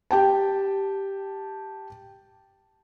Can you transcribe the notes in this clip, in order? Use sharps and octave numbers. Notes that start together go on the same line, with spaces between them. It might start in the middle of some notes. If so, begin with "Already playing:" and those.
G4 G5 A5